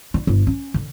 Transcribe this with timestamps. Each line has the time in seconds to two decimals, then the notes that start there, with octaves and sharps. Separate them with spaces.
0.14 D3
0.27 G1
0.47 C#4
0.74 D3